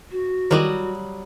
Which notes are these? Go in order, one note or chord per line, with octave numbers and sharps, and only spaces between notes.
F#4
E2 D#3 F#3 G3 D#5